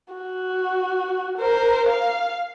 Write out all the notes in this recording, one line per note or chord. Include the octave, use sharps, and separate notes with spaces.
F#4
A#4 C5
F5